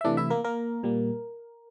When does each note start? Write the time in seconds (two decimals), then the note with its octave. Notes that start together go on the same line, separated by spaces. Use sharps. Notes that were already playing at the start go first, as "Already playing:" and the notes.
0.01 E5
0.04 C3 E3 A3 D4 D5
0.17 E4 E5
0.30 A#3 A#4
0.44 A#3 A#4
0.83 A#2 G3 A#3